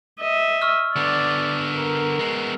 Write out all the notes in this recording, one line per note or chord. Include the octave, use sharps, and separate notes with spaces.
D#5 E5
C#6 E6 F6
D3 B3 D5
A#4
G#3 B3